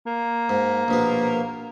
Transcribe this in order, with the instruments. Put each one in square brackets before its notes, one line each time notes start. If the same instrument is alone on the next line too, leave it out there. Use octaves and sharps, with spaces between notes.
[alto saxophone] A#3
[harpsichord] G#2
A#1 B2 B3